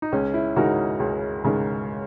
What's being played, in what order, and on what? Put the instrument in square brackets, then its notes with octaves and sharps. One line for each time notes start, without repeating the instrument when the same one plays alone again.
[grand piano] D#4
[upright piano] C#2 [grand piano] C#4
[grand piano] E4
[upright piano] C#3 G#3 D#4 A#4 [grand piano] F#4
[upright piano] C#2
C#3 G#3 D#4 A#4